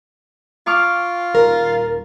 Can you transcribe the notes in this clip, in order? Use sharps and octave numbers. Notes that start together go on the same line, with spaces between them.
F4 C#6 D6 F6
D#1 A#4